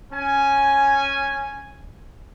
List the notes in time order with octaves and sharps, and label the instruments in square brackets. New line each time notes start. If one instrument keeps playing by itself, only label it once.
[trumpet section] C#4 G#5